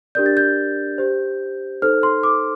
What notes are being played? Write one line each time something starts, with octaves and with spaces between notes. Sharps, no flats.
D4 G4 A#4 D5 G6
A6
G6
G4 C5
D#4 A4 C5 F6
C6
D6